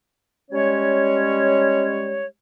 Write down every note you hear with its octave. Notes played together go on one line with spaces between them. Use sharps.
G3 G#3 C#4 C#5